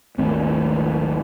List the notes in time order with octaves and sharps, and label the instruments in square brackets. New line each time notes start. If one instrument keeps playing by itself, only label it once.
[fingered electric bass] G#1 D#2 A3 C4